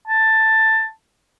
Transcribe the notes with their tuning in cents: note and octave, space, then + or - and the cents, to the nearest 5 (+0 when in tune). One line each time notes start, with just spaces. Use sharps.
A5 +10